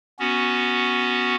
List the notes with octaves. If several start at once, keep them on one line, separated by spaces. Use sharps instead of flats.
B3 C#4 F#4